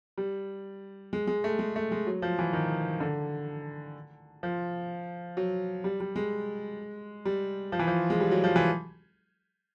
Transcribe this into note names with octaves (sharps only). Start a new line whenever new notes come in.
G3
G#3
G#3
A3
G#3
A3
G#3
F#3
F3
E3
D#3
D3
F3
F#3
G3
G3
G#3
G3
F3
E3
F3
G#3
G3
F#3
F3
E3